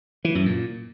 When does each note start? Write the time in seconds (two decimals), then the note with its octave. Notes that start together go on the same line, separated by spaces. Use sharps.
0.25 E3
0.35 F#2
0.46 A#2